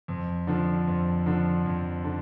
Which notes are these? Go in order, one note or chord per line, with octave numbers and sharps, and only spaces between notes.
F2
D3 F3
F2
D3 F3
F2
D3